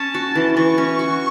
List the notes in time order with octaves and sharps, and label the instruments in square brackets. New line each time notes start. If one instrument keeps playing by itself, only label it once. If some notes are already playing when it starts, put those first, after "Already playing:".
Already playing: [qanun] C#4 [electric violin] A5
[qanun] F#4
E3
[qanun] E3 [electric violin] C#6
[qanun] C#4
F#4